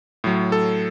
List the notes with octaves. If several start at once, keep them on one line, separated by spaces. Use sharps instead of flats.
A2 F#3
A4